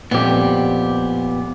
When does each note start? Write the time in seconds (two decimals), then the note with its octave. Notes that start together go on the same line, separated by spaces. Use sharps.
0.11 F2 A#2 B3 G4